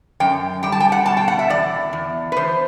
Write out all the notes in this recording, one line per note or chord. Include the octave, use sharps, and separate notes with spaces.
F#2 G5
G3 G5
A5
G5
F#5
B2 A5
G5
F#5
E5
E2 D5
E2
B4
E2 C5